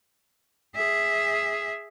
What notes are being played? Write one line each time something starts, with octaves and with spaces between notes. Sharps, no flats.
G#4 E5